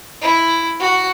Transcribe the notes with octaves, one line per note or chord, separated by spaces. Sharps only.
E4
F#4